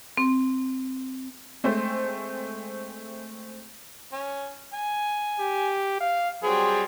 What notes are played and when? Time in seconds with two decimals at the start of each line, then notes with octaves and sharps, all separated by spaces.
0.17 C4
1.64 G#3 A3 C4 C5
4.12 C#4
4.73 G#5
5.40 G4
6.01 F5
6.43 F#3 G3 C4 G#4